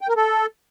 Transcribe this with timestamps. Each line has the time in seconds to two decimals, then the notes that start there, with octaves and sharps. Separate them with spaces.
0.01 G5
0.09 A#4
0.16 A4